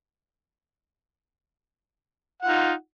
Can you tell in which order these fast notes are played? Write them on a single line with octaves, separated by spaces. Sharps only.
F#5 F4 D#4